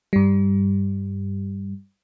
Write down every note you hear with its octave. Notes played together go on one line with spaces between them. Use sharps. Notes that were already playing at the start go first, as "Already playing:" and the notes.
G2 G3